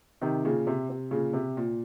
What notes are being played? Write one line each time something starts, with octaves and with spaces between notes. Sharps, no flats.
C3 D#3
A#2 C#3
C3
C3
A#2 C#3
C3
A#2